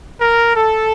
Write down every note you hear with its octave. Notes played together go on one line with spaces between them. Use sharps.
A#4
A4